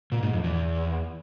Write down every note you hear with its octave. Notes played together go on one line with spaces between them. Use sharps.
A#2
G#2
F2
E2